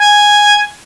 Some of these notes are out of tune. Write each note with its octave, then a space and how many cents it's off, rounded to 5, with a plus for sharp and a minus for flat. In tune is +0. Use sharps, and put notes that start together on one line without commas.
G#5 -5